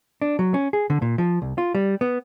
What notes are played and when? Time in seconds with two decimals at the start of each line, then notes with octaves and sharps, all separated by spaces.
0.22 D4
0.39 F#3
0.54 C#4
0.73 G#4
0.90 D3
1.02 A#2
1.18 F3
1.42 C2
1.58 F4
1.75 G3
2.01 B3